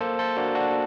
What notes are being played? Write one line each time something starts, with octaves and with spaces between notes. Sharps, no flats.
A#3 A4 C5
A4 C5
A#3 D4 F#4
D4 F#4